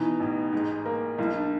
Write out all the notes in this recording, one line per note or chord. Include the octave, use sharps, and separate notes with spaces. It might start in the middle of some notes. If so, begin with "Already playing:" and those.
Already playing: B2 E3 D#4
A1
G#2
A#3
B1 E4
D#4
D4